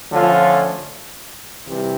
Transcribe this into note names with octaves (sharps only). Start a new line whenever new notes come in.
D3 F3 A3 C#4 F4
C3 E3 G3